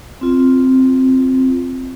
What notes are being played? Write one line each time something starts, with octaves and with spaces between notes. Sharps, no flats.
C4 F4